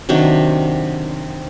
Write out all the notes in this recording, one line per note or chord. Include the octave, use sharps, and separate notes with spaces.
C3 D#3 F#3 D4